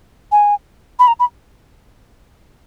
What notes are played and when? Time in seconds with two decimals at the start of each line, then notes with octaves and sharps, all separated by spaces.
0.32 G#5
0.99 B5
1.07 A#5
1.19 B5